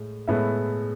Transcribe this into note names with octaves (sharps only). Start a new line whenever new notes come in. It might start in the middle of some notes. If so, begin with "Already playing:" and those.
Already playing: A2 G#3
A2 G#3 B3 E5